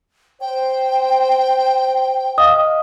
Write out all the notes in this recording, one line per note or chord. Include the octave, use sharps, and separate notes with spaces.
C5 G5
D#5 F5 D#6